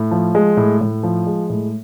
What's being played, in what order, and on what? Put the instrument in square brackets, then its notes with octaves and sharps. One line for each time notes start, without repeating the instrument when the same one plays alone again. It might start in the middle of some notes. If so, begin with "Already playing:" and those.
Already playing: [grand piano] A2
F3
G#3
A2
A2
F3
G#3
A2